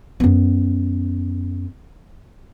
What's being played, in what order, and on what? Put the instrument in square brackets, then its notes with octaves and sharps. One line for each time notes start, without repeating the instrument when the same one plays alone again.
[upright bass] F#2 B3